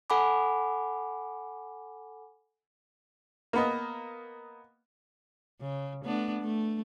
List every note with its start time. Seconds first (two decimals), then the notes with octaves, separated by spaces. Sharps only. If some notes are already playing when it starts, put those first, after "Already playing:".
0.10 A4 F#5 G#5 B5 D6
3.53 A#3 B3 D#5
5.61 C#3
6.05 A3 B3 D4
6.41 A3